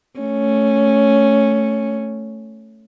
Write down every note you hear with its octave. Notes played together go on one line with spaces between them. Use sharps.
A3 C#4